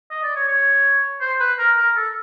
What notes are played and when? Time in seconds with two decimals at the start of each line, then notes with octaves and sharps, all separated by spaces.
0.11 D#5
0.23 D5
0.36 C#5
0.48 C#5
1.21 C5
1.40 B4
1.59 A#4
1.77 A#4
1.96 A4